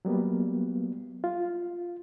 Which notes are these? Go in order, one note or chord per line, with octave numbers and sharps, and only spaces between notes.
F#3 G3 A#3 B3
F4